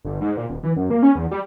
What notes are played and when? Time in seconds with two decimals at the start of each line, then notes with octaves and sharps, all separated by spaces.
0.05 G1
0.21 G#2
0.37 A#2
0.49 D#1
0.63 E3
0.76 F#2
0.90 A#3
1.02 C#4
1.15 E2
1.31 G3